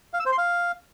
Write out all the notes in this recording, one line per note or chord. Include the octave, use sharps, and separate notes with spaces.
F5
E6
C5
C6
F5